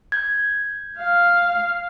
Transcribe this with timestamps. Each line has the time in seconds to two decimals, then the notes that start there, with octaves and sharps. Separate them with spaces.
0.12 G6 G#6
0.99 F5